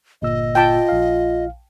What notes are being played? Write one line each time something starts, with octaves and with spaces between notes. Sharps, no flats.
G1 A#2 D#5 E6
F4 G5 A5
A#1 F5